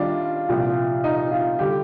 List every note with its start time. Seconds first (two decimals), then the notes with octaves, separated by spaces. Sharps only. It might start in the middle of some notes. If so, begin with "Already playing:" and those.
Already playing: D#3 G3 D4 F4
0.49 C2 A#2 F3
1.04 D#4
1.31 F4
1.59 D3 G3 G4